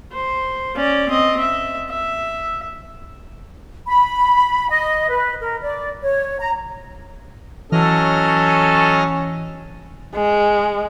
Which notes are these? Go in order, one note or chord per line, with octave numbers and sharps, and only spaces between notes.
C5
C#4 D5
C4 D#5
E5
E5
B5
D#5
B4
A#4
D5
C#5
A#5
E3 F#3 C#4 A4 D#5 F6
G#3